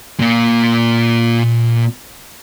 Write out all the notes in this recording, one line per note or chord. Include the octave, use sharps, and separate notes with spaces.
A#2 A#3